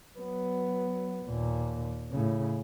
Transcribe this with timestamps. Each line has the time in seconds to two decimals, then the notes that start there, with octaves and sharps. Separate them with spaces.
0.16 F#3 B3
1.24 D#2 A#2
2.11 A2 C#3